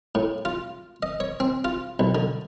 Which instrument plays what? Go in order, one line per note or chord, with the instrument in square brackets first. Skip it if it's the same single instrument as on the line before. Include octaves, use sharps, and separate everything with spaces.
[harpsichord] A2
F4
D#5
C#5
C4
F4
B1
D3